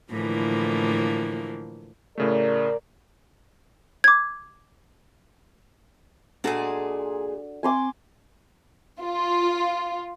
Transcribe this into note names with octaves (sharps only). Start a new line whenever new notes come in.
A2 D3 E3 F3 A#3
A2 C#3 A3 A#4 D5
D6 G#6
A#2 G#3 D4 F#4 G#4 A4
C4 G#5 C6 D6
F4